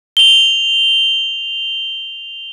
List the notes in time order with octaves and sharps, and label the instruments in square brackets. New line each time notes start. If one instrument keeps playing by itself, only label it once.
[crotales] F7 G7